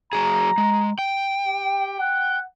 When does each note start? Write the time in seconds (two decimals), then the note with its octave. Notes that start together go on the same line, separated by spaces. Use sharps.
0.13 F#3 G#4 A#5
0.58 G#3
0.99 G5
1.47 G4
2.00 F#5